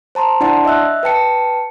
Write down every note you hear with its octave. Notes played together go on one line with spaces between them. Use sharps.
C5 A5 A#5 C6
D4 E4 D5 F#5 A5 C6
D#5 E5 E6 F#6
B4 G5 A5 C#7